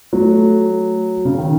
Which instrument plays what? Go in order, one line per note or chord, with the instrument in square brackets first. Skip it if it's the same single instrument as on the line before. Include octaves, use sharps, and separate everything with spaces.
[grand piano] F#3 [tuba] A3
[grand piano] C#3
D#3